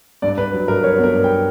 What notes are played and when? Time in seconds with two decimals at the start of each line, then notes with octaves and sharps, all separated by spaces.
0.22 G2 D5
0.37 G2 B4
0.53 F#3
0.68 G2 A#4
0.83 F#3 C#5
0.99 B3 A#4
1.14 G2
1.24 G5